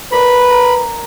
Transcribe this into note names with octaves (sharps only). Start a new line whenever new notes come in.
A#4 B4 D5 B5
A#5